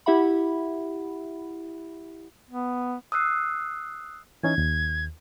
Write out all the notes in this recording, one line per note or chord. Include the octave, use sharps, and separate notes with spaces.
E4 G4 E5 F#5 B5
B3
D#6 E6 F#6 C7
E3 C#4 D#4 G#6
D#2